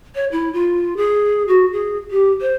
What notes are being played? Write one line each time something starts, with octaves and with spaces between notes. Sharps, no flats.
C#5
E4
F4
G#4
F#4
G#4
G4
C5